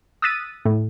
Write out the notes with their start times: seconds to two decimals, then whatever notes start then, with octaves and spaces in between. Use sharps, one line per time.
0.22 D#6 E6 F#6 A6 B6 D#7
0.65 A2